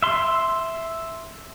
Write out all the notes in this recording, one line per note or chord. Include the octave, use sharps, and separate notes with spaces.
E5 C6